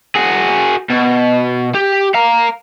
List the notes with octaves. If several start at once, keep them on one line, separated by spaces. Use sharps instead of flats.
F#4 G#4
B2
G4
F5 A#5